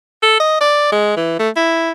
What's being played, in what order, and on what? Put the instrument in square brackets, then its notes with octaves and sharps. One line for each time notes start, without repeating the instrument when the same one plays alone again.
[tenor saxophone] A4
D#5
D5
G#3
E3
A3
E4